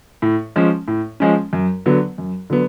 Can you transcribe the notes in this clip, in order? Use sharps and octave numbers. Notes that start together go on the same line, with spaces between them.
A2
F3 G#3 C#4
A2
F3 G#3 C#4
F#2
D3 F#3 B3
F#2
D3 F#3 B3